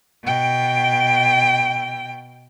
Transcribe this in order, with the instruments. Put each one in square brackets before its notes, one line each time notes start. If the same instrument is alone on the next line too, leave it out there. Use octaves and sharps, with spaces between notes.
[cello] B2 G5